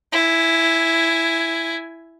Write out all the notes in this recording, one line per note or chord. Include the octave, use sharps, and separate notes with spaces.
E4 G#5